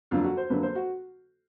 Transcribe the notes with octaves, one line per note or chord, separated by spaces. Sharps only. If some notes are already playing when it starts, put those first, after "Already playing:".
F2 D3 F#3 A#3 D4 F4
F#4
C5
F2 D3 F#3 A#3 D4 B4
C5
F#4